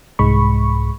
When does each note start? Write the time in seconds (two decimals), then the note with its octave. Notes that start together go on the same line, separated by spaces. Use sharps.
0.19 C2 G#2 G#3 B5 C#6